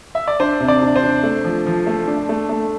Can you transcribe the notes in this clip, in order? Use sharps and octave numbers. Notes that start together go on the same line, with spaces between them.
E5
D5
D4 C5
C3
D5
D4
C5
D4
A3
F3
F3
A3
D4
A3
A3